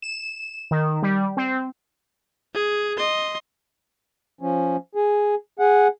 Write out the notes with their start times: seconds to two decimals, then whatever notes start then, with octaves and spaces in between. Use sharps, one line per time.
0.02 E7
0.71 D#3
1.03 G3
1.37 C4
2.55 G#4
2.97 D#5 C6
4.41 F3 C#4
4.95 G#4
5.59 G#4 F#5